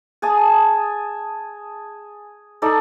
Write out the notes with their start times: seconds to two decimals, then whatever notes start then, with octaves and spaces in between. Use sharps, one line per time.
0.22 G#4 G#5 A5 D#6
2.62 D#4 A4 D5